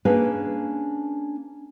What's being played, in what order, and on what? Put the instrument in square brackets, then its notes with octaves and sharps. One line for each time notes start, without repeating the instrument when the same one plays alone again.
[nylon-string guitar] A#3 C#4 D4 G#4 B4